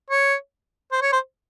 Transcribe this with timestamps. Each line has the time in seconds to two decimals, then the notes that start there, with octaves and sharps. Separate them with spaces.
0.10 C#5
0.92 C5
1.02 C#5
1.12 C5